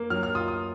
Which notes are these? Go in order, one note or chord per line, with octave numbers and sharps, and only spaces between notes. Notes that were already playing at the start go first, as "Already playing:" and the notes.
Already playing: A#3
F#3 F6
F6
F4 D#6
D#6